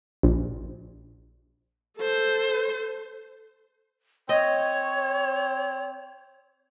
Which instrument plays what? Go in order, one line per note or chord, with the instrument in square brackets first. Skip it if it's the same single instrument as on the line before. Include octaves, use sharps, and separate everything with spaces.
[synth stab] A#1
[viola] A4 C5
[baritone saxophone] C4 [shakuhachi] C#5 [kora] D#5